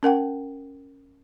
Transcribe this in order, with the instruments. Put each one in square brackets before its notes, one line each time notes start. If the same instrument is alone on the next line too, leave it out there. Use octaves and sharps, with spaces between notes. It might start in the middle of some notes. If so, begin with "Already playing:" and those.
[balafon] C#4 A#4 F#5 G5